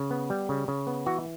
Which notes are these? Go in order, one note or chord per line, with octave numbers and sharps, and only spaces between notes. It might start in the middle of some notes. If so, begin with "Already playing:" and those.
Already playing: C#3
B3
G3
C#3
C#3
B3
E3 F#4